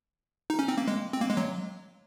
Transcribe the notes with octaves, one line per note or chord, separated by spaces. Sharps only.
D#4
C#4
C4
A#3
G#3
C4
A#3
G#3
F#3